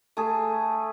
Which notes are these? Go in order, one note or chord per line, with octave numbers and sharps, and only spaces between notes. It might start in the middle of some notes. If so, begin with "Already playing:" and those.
A3 G#4